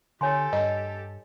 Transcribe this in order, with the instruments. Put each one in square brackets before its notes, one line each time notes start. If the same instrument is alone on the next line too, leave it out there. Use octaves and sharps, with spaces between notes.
[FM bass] D3 [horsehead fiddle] G4 A4 [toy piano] C#5 G#5 C6
[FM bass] G2 [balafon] D#5